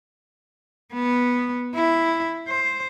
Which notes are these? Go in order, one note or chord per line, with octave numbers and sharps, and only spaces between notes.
B3
E4
C5